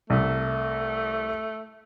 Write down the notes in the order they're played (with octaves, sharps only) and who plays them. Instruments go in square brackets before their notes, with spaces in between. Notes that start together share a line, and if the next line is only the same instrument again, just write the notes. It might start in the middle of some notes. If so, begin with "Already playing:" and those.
[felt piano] C2 [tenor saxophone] A3